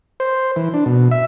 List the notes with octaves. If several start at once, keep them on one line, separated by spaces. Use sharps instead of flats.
C5
E3
D4
B2
E5